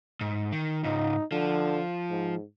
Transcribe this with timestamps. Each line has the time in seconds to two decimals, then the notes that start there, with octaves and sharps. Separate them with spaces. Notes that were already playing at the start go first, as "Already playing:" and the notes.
0.21 G#2
0.52 D#3
0.84 C#2 G#2 D#4
1.32 D3 F3
2.10 G#2